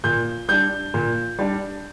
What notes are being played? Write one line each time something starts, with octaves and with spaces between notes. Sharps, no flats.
A#2 G6
G3 D4 G6
A#2
G3 D4